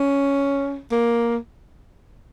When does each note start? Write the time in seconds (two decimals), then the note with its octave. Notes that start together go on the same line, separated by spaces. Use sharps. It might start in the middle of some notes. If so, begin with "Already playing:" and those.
Already playing: C#4
0.92 A#3